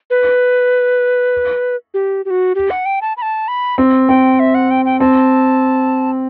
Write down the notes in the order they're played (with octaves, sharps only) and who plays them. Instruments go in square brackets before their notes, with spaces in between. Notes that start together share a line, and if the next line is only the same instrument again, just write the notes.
[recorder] B4
G4
G4
F#4
G4
F#5
G5
A5
B5
A5
B5
[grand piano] C4
[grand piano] C4 [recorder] G5
[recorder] E5
F#5
G5
G5
[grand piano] C4 [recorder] A5